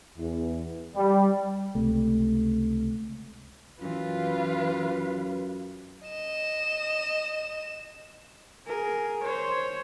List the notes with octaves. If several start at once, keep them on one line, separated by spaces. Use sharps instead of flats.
E2
G3
C#2 C3 A3
F#2 E3 F4 B4 F5
D#5 E7
G#4 A#4
C5 C#5